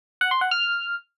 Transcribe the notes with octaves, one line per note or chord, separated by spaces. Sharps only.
F#5
C6
F#5
F6